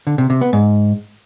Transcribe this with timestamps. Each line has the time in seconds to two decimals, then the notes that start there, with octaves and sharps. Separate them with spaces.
0.07 D3
0.18 C3
0.30 C3
0.41 B3
0.53 G#2